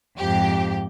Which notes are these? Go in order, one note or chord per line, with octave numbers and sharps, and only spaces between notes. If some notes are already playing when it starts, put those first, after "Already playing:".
F2 G#2 G4